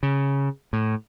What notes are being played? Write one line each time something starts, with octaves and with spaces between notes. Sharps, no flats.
C#3
A2